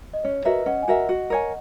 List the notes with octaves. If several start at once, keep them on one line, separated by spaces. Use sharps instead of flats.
D#5
C#4 C#5
F#4 A#4 B4 D#5 E5
C#4 D#5 F#5
G#5
F#4 A#4 D#5 E5 F#5
F#4
A#4 C#5 G#5